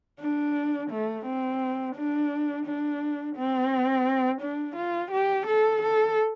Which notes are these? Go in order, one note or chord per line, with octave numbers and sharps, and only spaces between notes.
D4
A3
C4
D4
D4
C4
D4
F4
G4
A4
A4